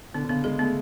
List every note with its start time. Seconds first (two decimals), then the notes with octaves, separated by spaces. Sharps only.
0.14 D3 B3
0.24 D3
0.29 C#3 B3
0.44 G#3 G#4
0.59 A3 B3